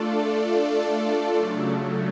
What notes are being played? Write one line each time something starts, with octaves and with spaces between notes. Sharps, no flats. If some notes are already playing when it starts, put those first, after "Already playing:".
Already playing: A3 D4 F4 A4 D5
C#3 F#3 A3